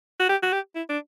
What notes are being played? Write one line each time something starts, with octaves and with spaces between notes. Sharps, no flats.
F#4
G4
F#4
G4
E4
D4